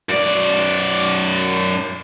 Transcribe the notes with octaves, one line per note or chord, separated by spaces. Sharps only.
F#2 D5